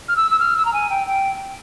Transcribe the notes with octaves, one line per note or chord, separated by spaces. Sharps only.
F6
E6
E6
F6
E6
A#5
G#5
G5
G5